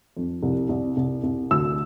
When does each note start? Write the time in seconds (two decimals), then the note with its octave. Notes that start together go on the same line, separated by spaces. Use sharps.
0.17 F2
0.43 C2
0.69 C2
0.97 C2
1.24 C2
1.51 D2 E6